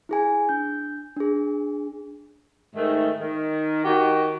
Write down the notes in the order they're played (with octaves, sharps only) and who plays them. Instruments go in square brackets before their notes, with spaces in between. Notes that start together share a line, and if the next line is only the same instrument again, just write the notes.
[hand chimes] E4 G#4 G#5
D4 G6
D4 G#4
[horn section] G#2 D#3 A3
D#3
D#3 F#4 G4